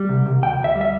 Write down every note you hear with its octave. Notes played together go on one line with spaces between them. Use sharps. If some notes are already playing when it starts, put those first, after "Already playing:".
Already playing: G3
C2
C2
D2 G5
D2 E5
G3
E5